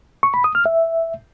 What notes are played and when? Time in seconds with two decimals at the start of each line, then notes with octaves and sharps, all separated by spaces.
0.23 C#6
0.34 B5
0.44 D#6
0.55 F6
0.66 E5